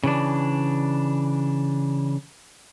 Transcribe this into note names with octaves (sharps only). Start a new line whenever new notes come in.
C#3 E3 D4